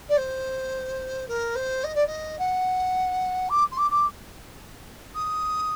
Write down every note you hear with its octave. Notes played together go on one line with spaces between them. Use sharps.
D5
C5
A#4
C5
D#5
D5
D#5
F#5
D6
C6
D6
D6
D#6